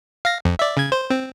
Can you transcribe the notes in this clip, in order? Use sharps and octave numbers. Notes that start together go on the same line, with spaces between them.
F5 A#6
F2
D5 E5
C#3 G#6
C5
C4